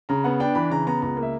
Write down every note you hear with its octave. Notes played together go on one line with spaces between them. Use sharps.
C#3 A#5
B3 F#5
D4 G5
E3 B5
C#3 A#5
B3 A#5
C#2 A#5
A#3
E5